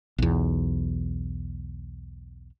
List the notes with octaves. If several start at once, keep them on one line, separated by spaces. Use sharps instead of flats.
B1 E2